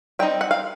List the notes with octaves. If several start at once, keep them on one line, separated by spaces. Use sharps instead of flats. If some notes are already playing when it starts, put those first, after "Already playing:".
G3 C4 D#4 G5
F#5
F5